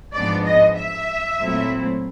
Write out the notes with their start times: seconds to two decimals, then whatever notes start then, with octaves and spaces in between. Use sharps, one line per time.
0.13 G#2 F3 G#3 B3 D4 D5
0.45 D#5
0.76 E5
1.39 A#2 F#3 A3 C4 E4